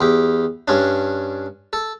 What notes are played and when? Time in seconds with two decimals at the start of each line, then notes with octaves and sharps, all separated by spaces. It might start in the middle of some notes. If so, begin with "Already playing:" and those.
0.01 E2 G4
0.68 G2 C#4 D4
1.73 A4